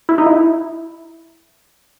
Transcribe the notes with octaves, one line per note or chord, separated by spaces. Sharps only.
E4
D#4
E4